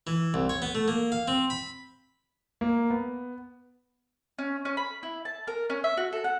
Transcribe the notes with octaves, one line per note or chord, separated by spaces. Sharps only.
E3
C2
C#5
B3
A3
A#3
F5
C4
B5
A#3
B3
C#4
C#4
B5
E4
A5
A#4
C#4
E5
F#4
A4
F#5